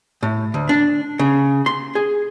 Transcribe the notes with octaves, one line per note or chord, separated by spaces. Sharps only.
A2
D2
D4
C#3
C6
G#4